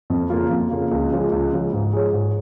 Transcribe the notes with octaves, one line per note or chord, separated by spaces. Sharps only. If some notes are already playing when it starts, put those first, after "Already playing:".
F2
C#3 A#3 F4
F2
C#3 A#3 F4
C#2
C#3 F3 G#3
C#2
C#3 F3 G#3
G#2
G#3 F4 C#5
G#2